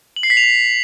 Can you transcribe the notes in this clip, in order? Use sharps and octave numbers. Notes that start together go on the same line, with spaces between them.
F#7
C7
B6
F7
C7